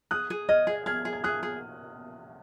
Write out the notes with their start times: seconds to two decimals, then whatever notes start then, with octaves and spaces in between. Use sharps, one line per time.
0.11 G#4 D#6 F#6
0.30 G#4
0.49 D#5 F6 G#6
0.67 G#4
0.86 G#4 F6 G#6
1.05 G#4
1.13 G#6
1.24 G#4 D#6 F#6
1.43 G#4